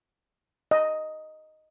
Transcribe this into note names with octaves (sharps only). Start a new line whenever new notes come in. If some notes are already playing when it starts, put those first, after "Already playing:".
D#5